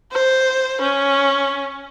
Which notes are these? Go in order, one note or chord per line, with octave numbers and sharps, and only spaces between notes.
C5
C#4